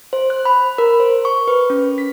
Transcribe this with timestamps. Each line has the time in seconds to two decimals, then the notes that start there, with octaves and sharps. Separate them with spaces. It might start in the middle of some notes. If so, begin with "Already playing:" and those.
0.13 C5
0.30 F#6
0.45 B5
0.78 A#4
1.00 C5
1.25 C#6
1.48 B4
1.70 C#4
1.98 B6